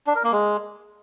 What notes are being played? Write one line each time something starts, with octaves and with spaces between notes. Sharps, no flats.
D4
A#4
A#3
G#3